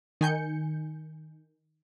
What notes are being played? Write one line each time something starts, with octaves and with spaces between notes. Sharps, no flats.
D#3 G#5 G6 C#7